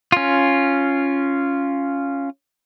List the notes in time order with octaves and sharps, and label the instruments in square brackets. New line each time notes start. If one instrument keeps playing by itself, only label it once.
[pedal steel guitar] C#4 F4